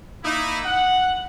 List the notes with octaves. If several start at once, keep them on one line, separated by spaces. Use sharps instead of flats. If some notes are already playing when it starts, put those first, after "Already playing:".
A#3 D#4 E4
F#5